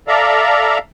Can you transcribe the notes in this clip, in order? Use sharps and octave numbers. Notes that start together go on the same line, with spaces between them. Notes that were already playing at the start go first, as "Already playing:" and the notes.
A4 D5 E5 F5 A#5